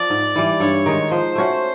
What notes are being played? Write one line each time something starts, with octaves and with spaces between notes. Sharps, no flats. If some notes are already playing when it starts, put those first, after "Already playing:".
Already playing: F3 D5
G#2
E3 G3
G2 C#5
D#3 G#3
F3 C5
A3 C#4 F#4